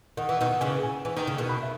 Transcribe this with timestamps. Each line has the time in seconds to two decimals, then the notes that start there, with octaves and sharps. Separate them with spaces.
0.17 D#3 F#5
0.29 E3
0.39 B2 D#3 F#5
0.60 C#3 E3 G#5
0.83 G#5
1.05 E3 G#5
1.16 D#3
1.27 C#3
1.38 B2 D#3
1.49 B5
1.62 E5